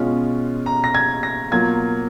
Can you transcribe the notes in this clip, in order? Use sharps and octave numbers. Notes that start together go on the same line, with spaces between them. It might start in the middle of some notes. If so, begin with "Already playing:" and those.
Already playing: B2 G#3 C#4 F4
A#5
A#6
G#6
A#6
B2 F#3 A#3 F4 G#6